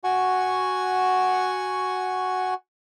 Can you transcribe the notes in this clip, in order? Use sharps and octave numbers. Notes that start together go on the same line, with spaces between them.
F#4 F#5 G#5 C#6